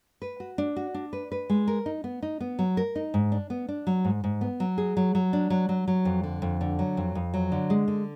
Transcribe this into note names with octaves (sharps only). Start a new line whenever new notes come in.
B4
F#4
D4
F#4
D4
B4
B4
G#3
A#4
D#4
B3
D#4
B3
F#3
A#4
D#4
G#2
D4
B3
D4
F#3
G#2
G#2
B3
F#3
G#4
F#3
F#3
D4
F#3
F#3
F#3
F2
D3
F2
D3
F#3
F2
F2
F#3
D3
G#3
D3